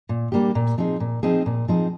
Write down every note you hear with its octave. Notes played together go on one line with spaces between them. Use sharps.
A#2
G3 A#3 D4 G4
A#2
F3 C4 D#4 G#4
A#2
F3 C4 D#4 G#4
A#2
F3 C4 D#4 G#4